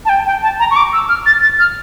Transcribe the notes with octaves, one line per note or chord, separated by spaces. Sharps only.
A5
G5
G5
A5
A#5
C#6
D6
E6
F6
A6
A6
F6